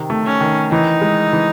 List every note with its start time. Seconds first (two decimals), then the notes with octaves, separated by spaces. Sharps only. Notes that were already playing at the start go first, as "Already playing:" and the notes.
Already playing: C3 D#3
0.10 A3
0.26 C#4
0.41 D#3
0.71 E3 D#4
1.01 G#3
1.33 E3